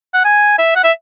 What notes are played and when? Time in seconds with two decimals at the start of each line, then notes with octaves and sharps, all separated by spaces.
0.14 F#5
0.25 G#5
0.58 E5
0.76 F#5
0.84 E5